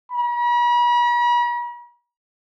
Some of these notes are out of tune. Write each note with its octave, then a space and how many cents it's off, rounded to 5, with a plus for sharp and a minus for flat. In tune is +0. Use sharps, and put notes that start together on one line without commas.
B5 -45